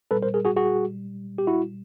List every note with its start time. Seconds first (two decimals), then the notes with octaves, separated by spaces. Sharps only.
0.11 A#2 G3 A4 B4
0.23 A#4 C5
0.34 G#4 A#4
0.45 F#4 G#4
0.56 F#4 G#4
1.38 G4
1.47 E4 F#4